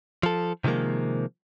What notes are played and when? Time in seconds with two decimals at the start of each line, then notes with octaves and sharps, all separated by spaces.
0.23 F3 A4
0.64 C3 D#3 F3 G#3 A#3